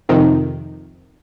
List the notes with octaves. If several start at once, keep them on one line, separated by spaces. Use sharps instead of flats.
F2 C3 D#3